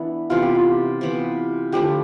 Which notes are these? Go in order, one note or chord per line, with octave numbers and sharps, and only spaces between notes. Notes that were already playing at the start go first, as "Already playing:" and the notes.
Already playing: E3 B3 D4 E4
C3 E3 B3 F4
G4
F4
C3 E3 B3
D3 F3 A3 E4 G4